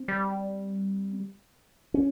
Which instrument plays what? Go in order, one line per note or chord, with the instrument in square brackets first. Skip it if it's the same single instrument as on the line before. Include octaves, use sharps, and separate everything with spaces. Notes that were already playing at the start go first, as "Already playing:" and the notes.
Already playing: [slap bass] C4
[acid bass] G3
[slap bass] C#4